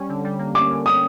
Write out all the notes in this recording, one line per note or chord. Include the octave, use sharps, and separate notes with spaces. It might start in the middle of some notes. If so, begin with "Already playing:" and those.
Already playing: G3 C#4
D3
G3
A#3
C#4 D6
D3
G3 D#6